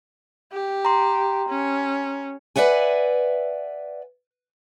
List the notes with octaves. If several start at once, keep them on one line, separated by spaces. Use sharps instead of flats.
G4
A#5 C6
C#4
B4 D5 E5 F#5 G#5